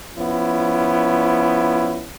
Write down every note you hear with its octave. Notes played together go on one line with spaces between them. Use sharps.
F3 B3 C#4 E4